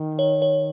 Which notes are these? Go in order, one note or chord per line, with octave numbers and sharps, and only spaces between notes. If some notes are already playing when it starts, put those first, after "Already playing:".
Already playing: D#3
C#5
C#5